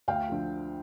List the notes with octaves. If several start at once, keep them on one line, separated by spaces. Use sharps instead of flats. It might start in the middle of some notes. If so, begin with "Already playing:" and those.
D2 F5 G5
D3 F3